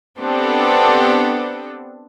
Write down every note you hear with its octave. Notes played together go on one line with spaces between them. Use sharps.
B3 C4 D4 G4 A4